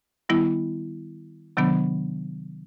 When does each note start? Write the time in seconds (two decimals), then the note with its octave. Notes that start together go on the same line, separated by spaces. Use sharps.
0.29 D#3 G3 B3 E4
1.57 C3 D#3 F#3 B3 D4